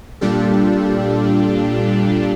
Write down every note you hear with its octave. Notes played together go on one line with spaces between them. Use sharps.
A#2 G3 D4 F4 G4 A4